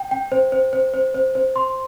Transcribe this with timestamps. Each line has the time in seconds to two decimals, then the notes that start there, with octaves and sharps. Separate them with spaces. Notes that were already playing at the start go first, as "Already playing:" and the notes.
Already playing: G5
0.11 G5
0.32 C5
0.52 C5
0.73 C5
0.94 C5
1.14 C5
1.35 C5
1.56 C6